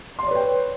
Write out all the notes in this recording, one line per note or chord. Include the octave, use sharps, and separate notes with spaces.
B4 C#5 D5 G5 C6